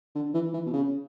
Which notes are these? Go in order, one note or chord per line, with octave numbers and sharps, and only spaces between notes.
D3
E3
E3
B2
C#3